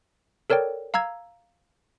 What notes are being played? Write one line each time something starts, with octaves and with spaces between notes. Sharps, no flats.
A4 A#4 C#5 D5 G5
F5 A#5 E6 G#6